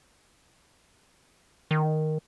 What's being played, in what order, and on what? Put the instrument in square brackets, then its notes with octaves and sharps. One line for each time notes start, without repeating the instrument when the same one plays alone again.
[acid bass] D#3